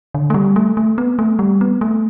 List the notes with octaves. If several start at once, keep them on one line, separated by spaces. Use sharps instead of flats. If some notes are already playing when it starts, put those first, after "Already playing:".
D3
A3
G3
A3
A3
B3
A3
G3
B3
A3